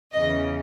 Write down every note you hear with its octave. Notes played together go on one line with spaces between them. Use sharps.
E2 C#3 E3 D#5